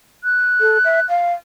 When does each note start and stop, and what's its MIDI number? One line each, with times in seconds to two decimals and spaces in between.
0.24 1.06 90
0.61 0.78 69
0.84 1.00 76
1.09 1.33 77